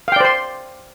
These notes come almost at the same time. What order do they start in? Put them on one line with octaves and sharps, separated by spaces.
F5 G5 D5 C5 C6